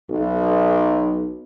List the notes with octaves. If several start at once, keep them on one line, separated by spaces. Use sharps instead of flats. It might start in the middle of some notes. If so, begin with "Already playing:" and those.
B1